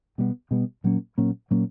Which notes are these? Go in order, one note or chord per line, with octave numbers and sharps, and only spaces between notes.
B2 G3 B3
B2 G3 B3
A#2 F#3 A#3 C#4
A#2 F#3 A#3 C#4
A#2 F#3 A#3 C#4